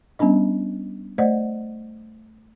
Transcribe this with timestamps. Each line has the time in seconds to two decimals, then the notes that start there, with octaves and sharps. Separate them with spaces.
0.19 G3 B3 C#4 D4 D#5
1.18 A3 C5 D5 D#5 F#5